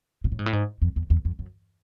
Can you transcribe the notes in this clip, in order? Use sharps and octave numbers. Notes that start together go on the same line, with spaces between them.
A#2
A2
G#2
A2
G#2
F2
E2
E2
F2
F#2